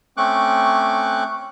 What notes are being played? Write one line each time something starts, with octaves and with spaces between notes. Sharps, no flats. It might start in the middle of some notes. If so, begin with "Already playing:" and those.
A3 C4 C#4 C#6 D6 F#6